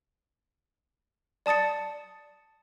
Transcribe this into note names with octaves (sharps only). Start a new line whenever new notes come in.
D5 A5 D#6 A6 C#7